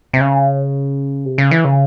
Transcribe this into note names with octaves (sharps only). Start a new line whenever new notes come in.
C3
C#3
C3
C#3
E3
C#3